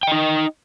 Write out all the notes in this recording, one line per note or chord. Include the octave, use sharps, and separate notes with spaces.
D#4 D#5 G5